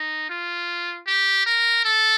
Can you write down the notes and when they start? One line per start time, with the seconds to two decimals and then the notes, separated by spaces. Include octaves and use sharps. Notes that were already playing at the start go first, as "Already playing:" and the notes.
Already playing: D#4
0.29 F4
1.07 G4
1.46 A#4
1.85 A4